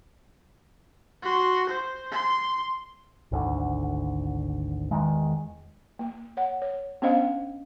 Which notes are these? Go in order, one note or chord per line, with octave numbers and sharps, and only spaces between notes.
F#4 C6
C5
C6
G#1 D2 D3
E2 D#3 G#3
A#3
C#5 F#5
C#5
B3 C#4 D4 C5 D#5 F5